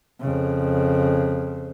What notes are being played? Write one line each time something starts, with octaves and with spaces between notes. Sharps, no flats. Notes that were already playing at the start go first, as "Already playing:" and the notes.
F2 C#3